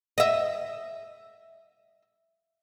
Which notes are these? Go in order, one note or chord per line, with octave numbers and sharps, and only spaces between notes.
D#5 E5